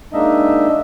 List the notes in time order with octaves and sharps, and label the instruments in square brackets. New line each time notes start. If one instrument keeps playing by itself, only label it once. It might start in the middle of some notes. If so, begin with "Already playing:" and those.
[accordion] G#3 A#3 D4 D#4 D#5 E5